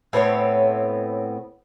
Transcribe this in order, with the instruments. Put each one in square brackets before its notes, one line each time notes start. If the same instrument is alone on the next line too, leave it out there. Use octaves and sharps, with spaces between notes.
[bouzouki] A2 B3 C4 C#5